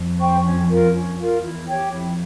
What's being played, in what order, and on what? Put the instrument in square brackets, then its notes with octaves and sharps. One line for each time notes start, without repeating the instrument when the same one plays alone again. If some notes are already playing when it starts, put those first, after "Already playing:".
Already playing: [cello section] F2
[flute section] C5 G5 C#6
C#4
F4 A#4
C#4
F4 A#4
[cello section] E2 [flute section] E4
[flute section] G4 C#5 G5
[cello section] F2 [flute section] E4